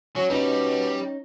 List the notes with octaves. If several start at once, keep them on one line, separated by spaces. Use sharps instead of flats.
F#3 C#4
B2 G3 C#4 D#4